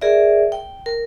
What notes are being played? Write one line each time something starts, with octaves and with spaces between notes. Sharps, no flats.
G#4 A#4 D5 E5
G5
A#4